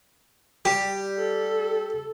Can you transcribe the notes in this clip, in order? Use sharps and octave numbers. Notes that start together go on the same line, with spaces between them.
G3 G4
A4